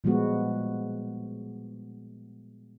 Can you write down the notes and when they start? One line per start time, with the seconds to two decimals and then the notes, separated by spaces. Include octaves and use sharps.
0.04 A#2 F3 G3 G#3 B3 F#4